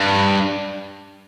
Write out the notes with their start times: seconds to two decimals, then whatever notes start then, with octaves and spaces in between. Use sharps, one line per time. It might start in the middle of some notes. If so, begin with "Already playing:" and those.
Already playing: G2